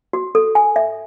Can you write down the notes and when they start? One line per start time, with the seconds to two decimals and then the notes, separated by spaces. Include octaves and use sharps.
0.13 F#4
0.35 A4
0.55 G#5
0.76 E5